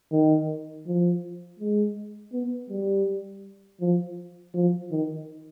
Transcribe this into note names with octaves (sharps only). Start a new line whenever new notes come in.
D#3
F3
G#3
B3
G3
F3
F3
D#3